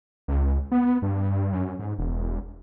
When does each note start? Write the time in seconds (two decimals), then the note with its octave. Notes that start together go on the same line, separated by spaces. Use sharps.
0.28 C#2
0.72 B3
1.02 G2
1.52 F#2
1.79 G#2
1.98 E1